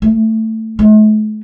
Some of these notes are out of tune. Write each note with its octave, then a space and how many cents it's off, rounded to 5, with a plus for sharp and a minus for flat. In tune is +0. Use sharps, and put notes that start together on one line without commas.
A3 +10
A3 -45